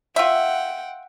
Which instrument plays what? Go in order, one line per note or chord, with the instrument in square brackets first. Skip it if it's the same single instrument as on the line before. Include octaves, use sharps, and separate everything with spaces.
[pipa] F4 E5 [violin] F#5 G5